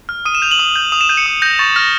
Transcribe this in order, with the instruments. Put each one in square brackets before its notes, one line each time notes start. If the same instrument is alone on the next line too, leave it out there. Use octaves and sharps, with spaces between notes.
[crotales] F6
D#6 D#7
E7
G6 F7
F#7
D#6
G6
D#6 F7
E7
G6 D#7
C#7
D#6
G6 A#6
C#6 A6
F6 A#6